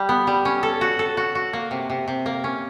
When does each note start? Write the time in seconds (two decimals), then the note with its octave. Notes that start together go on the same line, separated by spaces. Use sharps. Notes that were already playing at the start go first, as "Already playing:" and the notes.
Already playing: G3
0.09 B3
0.27 G3
0.45 C#4
0.63 A4
0.81 F#4
0.99 A4
1.17 F#4
1.35 F#4
1.53 A#3
1.71 C3
1.90 C3
2.08 C3
2.26 A#3
2.44 C#4